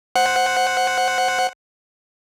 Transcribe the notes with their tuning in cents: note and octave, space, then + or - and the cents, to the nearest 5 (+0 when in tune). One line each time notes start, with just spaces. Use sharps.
C5 +0 F#5 +0